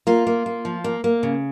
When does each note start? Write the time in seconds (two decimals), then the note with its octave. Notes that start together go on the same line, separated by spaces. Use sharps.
0.07 A#3 F4
0.27 A#3
0.46 A#3
0.65 F3
0.84 A#3
1.04 A#3
1.23 C#3